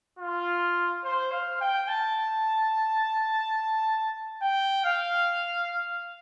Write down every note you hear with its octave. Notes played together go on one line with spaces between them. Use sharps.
F4
C5
F5
G5
A5
G5
F5